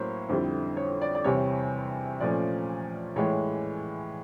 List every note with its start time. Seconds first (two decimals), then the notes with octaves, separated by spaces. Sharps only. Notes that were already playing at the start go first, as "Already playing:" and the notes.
Already playing: A2 F#3 A#3 C#4 E4 C5 C#5
0.29 F2 D3 G3 C4 E4
0.77 C#5
1.01 D5
1.15 D5
1.24 E2 C3 E3 G3 C4 C#5
2.20 A#2 F3 A3 C#4 D5
3.16 A2 E3 G#3 C#5